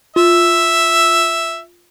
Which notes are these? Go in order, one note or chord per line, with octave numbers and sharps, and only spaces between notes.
F4 E5